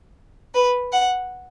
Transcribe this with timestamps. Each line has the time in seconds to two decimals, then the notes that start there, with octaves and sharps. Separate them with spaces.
0.54 B4
0.92 F#5